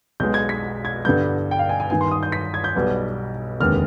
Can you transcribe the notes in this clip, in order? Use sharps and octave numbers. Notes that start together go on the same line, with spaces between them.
B1 B2 G#3 B3 G6
G#6
B6
G#6
G2 D3 G3 B3 G6
G5
F5
G#5
G#5
G2 D#3 B3 G#5
C6
D#6
G6
B6
G#6
G6
B1 B2 G3 B3
F1 D#2 D3 G#3 B3 F6